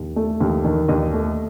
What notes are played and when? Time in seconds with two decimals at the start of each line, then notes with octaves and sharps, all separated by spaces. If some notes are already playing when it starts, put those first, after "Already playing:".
Already playing: D#2
0.16 A3
0.40 D#2
0.64 D#3
0.88 D#2 D#5
1.13 A3